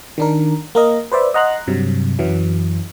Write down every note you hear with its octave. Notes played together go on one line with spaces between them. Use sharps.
D#3 D4 A#4
A#3 A#4 D#5
B4 C5 D5 E5
D#5 F#5 A#5 C6 F#6
G2 C3 F#3
F#2 E3 F#3